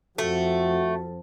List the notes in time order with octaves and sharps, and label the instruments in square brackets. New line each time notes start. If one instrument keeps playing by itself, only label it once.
[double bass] F2 [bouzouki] A3 [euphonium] F#4